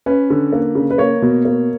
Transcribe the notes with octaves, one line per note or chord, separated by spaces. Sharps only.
C#4 B4
D3
A#3
C#3
B4
A#3 C#5
B2
A#3